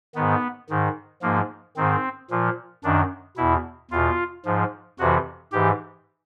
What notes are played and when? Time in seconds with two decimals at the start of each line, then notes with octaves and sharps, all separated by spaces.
0.15 G#2 D#3 B3
0.70 G#2 D#3
1.22 G#2 F3 A#3
1.77 G#2 D#3 C4
2.30 A#2 F3
2.84 F#2 D#3 D4
3.37 E2 B2 E4
3.91 E2 B2 F4
4.45 G#2 F3
4.99 F2 C3 E3 F#4
5.52 G#2 E3 G4